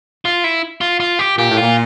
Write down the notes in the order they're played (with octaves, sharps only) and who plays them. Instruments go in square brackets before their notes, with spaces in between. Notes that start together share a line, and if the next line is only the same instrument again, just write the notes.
[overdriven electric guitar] F4
E4
F4
F4
G4
[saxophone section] A#2 [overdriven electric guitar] G4
[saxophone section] A2
[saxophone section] A#2 [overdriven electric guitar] F4